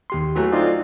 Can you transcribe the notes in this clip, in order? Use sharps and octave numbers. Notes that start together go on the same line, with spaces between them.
D#2 G4 C6
E3 F#3 A3
D3 C4 D#4 F4 D5 D#5